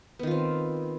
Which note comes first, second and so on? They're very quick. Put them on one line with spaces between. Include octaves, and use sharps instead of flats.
B3 D#3 F4 C4